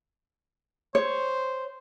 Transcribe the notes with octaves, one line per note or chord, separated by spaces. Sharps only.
C5 C#5